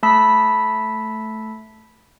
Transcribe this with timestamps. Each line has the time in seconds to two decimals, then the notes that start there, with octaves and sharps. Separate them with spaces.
0.03 A3 A5 B5 E6 B6